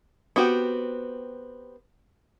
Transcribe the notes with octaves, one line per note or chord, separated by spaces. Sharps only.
B3 C4 F#4 G4